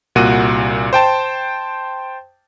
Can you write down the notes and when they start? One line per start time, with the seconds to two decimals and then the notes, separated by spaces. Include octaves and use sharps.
0.15 C2 A#2 F#4 D#7
0.93 C5 G5 A5